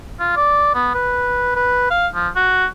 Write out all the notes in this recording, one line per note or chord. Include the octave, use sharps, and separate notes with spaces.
F4
D5
B3
B4
B4
F5
F3
F#4